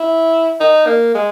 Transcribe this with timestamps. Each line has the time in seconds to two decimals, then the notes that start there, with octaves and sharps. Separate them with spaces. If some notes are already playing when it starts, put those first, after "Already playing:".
Already playing: E4
0.60 D#4
0.87 A#3
1.15 G#3